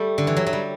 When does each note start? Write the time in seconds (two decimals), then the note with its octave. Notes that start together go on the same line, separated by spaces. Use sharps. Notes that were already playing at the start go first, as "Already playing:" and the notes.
Already playing: G3 A3
0.18 D3
0.27 E3
0.36 F#3
0.47 F#3
0.53 G3